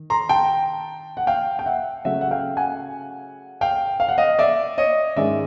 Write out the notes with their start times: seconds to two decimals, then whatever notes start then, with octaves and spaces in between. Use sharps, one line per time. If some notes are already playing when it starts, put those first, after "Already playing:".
Already playing: D#3
0.10 A#5 C6
0.29 G5 A5
1.17 F#5
1.27 F5 G5
1.59 G5
1.66 E5 F#5
2.05 C#3 F#3 A3 E5 F#5
2.21 F#5
2.31 F5 G5
2.57 F#5 G#5
3.61 F5 G5
4.00 F5
4.09 F#5
4.18 D#5 F5
4.39 D5 E5
4.78 C#5 D#5
5.16 G#2 D#3 G#3 C#4 D5 E5